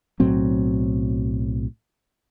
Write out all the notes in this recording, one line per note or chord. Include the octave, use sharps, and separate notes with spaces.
B1 A2 F#3 C4